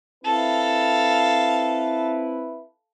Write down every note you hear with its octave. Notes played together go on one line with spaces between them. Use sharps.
C4 E4 A4 B4 F5